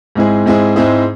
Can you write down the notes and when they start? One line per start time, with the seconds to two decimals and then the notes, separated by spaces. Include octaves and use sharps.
0.16 G#2 G#3 C4 E4 G#4
0.46 G#2 G#3 C4 E4 G#4
0.76 G#2 G#3 C4 E4 G#4